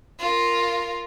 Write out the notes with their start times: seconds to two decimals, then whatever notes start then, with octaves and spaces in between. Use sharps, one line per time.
0.19 F4 A#4